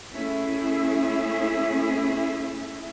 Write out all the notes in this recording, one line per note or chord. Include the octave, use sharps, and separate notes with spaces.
A3 C#4 E4 G#4 E5